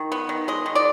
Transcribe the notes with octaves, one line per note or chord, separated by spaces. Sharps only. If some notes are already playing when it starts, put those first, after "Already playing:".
Already playing: D#3
B3
D#3
G#3 D#5
D#3
D5